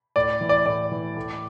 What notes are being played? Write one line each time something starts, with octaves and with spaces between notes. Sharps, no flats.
A2 D5
E3
D5
A2 D5
E3
A2